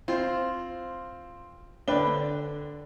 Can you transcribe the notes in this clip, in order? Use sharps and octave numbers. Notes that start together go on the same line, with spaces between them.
C4 F4 C5
D3 D4 B4 G5 G7